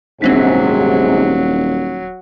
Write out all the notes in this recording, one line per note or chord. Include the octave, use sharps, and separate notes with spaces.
D#1 G#2 C3 F#3 C4 D4 B6